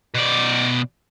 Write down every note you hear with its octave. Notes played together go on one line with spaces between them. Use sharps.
B2 D5